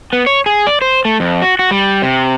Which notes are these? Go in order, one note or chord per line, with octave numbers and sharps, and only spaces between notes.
B3
C#5
G#4
D5
C5
A3
F2
F#4
F#4
G3
C3